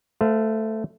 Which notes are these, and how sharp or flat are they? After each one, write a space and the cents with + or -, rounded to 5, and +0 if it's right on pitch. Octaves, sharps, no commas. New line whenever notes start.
A3 +0 C5 -30 F5 +0